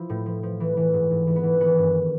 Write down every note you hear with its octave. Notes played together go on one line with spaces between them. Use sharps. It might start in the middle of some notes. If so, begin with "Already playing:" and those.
Already playing: F3 E4
A2
F3
F3
E3
E3
G#2
G#2
E3
B3
E3
D#3 B3
G2